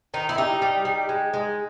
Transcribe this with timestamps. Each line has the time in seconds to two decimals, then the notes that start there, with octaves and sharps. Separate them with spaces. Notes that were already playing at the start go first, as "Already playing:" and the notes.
0.14 D#3 D#4
0.29 E4
0.38 G3 D#4
0.62 G3
0.85 G3
1.09 G#3
1.34 G#3